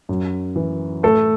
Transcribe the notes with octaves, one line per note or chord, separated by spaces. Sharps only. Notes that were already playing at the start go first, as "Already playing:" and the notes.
F#2
E3
A2 A3 A4